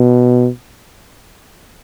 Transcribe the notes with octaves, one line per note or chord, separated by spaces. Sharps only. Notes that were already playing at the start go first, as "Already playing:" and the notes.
Already playing: B2